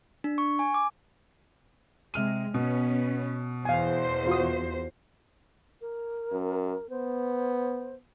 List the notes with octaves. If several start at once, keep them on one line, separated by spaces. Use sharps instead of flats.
D4
C#6
G#5
D6
C3 G#3 F6 D#7
B2 B3 C#4
E2 C5 F5 G#5
F4 F#4 D#6
A#4
F#2
B3 C5